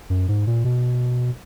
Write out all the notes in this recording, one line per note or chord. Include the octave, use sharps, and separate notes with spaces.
F#2
G#2
A#2
B2